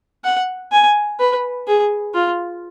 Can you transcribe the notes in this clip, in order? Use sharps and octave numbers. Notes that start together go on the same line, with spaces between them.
F#5
G#5
B4
G#4
F4